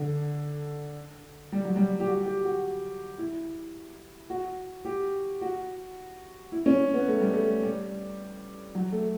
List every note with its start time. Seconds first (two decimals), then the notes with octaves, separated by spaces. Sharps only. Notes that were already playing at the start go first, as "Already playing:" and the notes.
Already playing: D3
1.52 G3
1.65 F#3
1.76 G3
2.00 G4
2.07 F#4
2.26 G4
2.44 F#4
3.18 E4
4.30 F#4
4.85 G4
5.41 F#4
6.52 E4
6.66 C#4
6.94 B3
7.08 A3
7.21 G3
7.33 A3
7.63 G3
8.75 F#3
8.92 A3